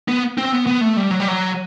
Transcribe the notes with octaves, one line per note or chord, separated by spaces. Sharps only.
B3
C4
B3
B3
A3
G3
F#3
G3
F#3